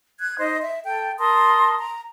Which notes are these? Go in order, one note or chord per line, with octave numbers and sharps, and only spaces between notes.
F#6 G#6
D#4 C5 D#5
E5
A4 G5
A#4 A5 C6 D#6
A#5